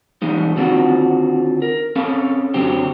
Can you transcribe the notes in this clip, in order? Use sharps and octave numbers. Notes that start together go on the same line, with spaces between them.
E3 G3 G#3 B3 D#4
D3 D#3 C4 F4 F#4
A#4
C4 C#4 A4 F5
F#2 D3 F#3 C4 G4